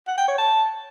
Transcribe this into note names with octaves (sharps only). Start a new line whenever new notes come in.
F#5
G5
C#5
A5